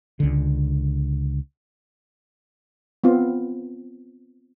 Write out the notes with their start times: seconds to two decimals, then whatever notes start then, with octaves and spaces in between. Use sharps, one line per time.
0.20 C#2 D3
3.04 B3 C4 F4